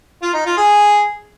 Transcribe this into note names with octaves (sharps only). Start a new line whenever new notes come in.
F4
D#4
F4
G#4